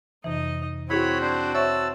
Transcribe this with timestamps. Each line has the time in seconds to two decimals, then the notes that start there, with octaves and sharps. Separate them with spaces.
0.24 F2 C3 E3 D#4 D#5
0.90 C4 E4 F#4 G#4 C#5 B5
1.21 D4 C5
1.55 C#5 E5 A5 C#6 E6